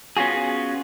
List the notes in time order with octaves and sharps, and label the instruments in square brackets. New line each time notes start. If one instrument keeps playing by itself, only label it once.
[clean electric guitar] B3 C#4 F4 F#4 G#4